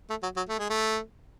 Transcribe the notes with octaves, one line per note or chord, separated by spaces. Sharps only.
A3
F#3
F#3
A3
G#3
A3